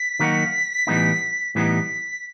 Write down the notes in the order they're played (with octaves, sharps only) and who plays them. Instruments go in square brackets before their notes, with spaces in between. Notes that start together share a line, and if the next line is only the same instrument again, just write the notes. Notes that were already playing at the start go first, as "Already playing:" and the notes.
Already playing: [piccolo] B6
[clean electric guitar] D#3 F#3 A#3 D#4 F#4
A2 E3 G3 B3 D#4
[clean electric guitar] A2 E3 G3 B3 D#4 [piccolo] B6